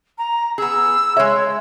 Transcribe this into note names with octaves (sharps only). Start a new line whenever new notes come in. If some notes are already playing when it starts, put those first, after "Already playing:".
A#5
B3 G#4 E6
G#3 C#5 E5